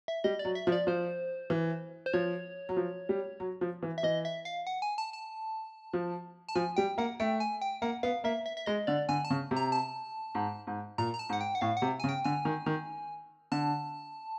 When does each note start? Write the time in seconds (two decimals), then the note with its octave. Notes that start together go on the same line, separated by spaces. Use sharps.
0.08 E5
0.24 G3 D#5
0.39 D5
0.45 F#3
0.55 E5
0.67 F3
0.72 D5
0.87 F3 C5
1.50 E3
2.06 C5
2.13 F3 C#5
2.69 F#3
2.77 F3
3.09 G3
3.40 F#3
3.61 F3
3.83 E3
3.98 E5
4.03 E3 D#5
4.25 E5
4.45 F5
4.67 F#5
4.82 G#5
4.98 A5
5.13 A5
5.93 F3
6.49 A5
6.55 F3 G#5
6.76 G3 G5
6.98 A#3 F#5
7.20 A3 G5
7.40 G#5
7.62 G5
7.82 A#3 F#5
8.03 B3 F5
8.24 A#3 E5
8.46 E5
8.57 E5
8.66 G#3 D#5
8.87 D3 D5
9.09 D3 G#5
9.25 A5
9.30 C#3
9.51 C3
9.56 A#5
9.72 A5
10.35 G#2
10.67 G#2
10.98 A#2 A#5
11.14 A#5
11.19 A5
11.29 G#2 F#5
11.41 G5
11.55 F#5
11.61 A2 F5
11.77 F#5
11.82 C3
12.00 C#3 G#5
12.09 G5
12.25 D3 G#5
12.45 D#3
12.66 D#3
13.52 D3 A5